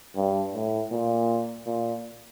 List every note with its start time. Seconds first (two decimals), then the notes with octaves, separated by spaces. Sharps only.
0.16 G2
0.54 A2
0.91 A#2
1.66 A#2